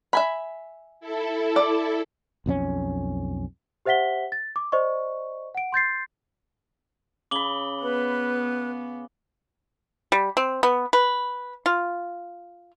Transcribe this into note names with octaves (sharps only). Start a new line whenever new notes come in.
E5 G#5 B5
E4 A4
D5
B1 F2 F3 C#4
G4 C5 E5 F#5 B6 G7
A6
D6
C5 D5 D#5 C#6
F#5 D7
C6 G6 A6 C7
C#3 B5 D6 F#7 G7
B3 B4
G3
C4
B3
B4
F4